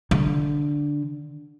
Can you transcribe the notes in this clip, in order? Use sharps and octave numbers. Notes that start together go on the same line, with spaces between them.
D3